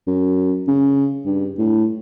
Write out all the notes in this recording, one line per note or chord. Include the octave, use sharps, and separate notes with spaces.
F#2
C#3
G2
A2